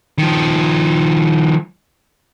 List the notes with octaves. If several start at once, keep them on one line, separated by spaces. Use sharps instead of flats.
D#3 F3